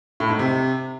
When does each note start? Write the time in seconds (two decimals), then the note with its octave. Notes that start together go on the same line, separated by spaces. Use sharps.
0.20 A2
0.30 G#2
0.39 C3